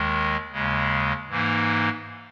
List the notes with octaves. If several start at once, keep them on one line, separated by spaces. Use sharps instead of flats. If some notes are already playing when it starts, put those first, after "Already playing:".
Already playing: D#2 D#3 G#3
D#2 C#3 G#3
G#2 E3 A#3 D#4